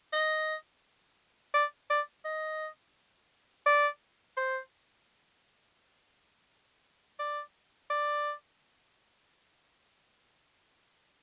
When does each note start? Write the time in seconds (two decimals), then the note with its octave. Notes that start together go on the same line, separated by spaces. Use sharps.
0.13 D#5
1.54 D5
1.90 D5
2.25 D#5
3.66 D5
4.37 C5
7.19 D5
7.90 D5